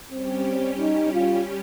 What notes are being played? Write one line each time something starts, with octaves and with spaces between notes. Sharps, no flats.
G3 C4 C#4 G4
D#4
F4